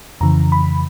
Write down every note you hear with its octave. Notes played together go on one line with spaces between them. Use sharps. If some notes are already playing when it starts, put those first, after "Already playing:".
F2 C#3 E3 A#5
B5